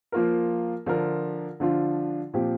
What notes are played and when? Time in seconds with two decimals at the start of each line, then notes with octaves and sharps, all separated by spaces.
0.12 F3 A#3 F4 A#4
0.86 D3 F3 D4 F4 A#4
1.60 D3 F3 D4 F4
2.34 A#2 F3 C4 G4